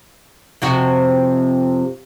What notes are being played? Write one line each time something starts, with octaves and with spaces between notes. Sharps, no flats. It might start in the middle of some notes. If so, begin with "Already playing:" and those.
F2 C3 F#4